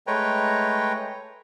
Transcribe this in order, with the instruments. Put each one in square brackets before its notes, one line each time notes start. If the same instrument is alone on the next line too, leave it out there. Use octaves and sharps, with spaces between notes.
[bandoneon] G#3 A3 B4 C#5 G5 A#5